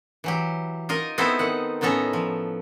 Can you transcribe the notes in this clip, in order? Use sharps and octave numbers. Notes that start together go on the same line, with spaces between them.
E3 F#3 G4
D#4 F4 A#4 D#5
B3 C4 D#4 E4 A4 C5
D#3 F#5
A2 D#3 B3 C#4 A4 A#5
F3